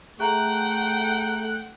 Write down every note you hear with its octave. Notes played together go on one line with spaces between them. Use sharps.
A3 G#4 E5 F#5 G5 A#5 F#6